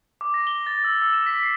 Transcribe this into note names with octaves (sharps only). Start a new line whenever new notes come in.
D6
A#6
G7
A6
E6
E6
E7
B6
C7